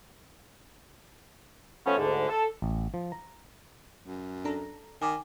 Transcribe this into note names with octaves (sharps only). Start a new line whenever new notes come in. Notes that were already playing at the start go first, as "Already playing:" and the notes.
F3 A3 B3 C#4
D2 G#2 D3
A4
A1
F3
A#5
F#2
D4 A4 A#5
D#3 G#5 D6